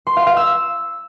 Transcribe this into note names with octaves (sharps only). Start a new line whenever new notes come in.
C6
F5
F5
E6